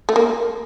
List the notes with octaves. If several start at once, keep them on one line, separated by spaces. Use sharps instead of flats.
A3
A#3